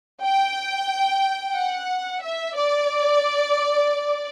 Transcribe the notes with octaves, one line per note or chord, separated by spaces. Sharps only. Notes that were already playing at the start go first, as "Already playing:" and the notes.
G5
F#5
E5
D5